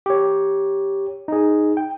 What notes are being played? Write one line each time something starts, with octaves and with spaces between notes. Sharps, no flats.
G4 C#5
D#4 G#4
G5